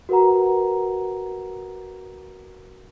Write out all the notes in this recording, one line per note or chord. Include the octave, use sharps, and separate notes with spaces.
F#4 A#4 B4 F#5 A#5